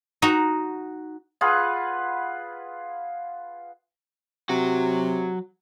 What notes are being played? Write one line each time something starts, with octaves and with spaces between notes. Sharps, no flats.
D#4 F#4
F4 G#4 B4 F#5
C3 F#3 F#4